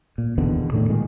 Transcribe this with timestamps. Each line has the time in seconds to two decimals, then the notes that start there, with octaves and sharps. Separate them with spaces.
0.18 A#2
0.38 E2 B2 D3 D#3
0.73 A2 D3 D#3
0.90 A#2 D#3 G#3